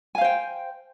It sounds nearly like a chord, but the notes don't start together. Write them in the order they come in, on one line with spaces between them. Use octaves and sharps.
G#5 F5 C5 G5